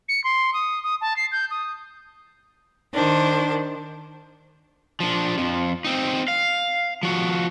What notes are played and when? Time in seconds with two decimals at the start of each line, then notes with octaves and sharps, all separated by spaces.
0.09 C#7
0.24 C6
0.53 D#6
0.83 D#6
1.01 A5
1.16 C7
1.32 G6
1.50 D#6
2.94 D#3 D4 C5
5.00 F3 D4
5.38 F2 F3
5.84 C4 D#4
6.28 F5
7.03 F3 F#4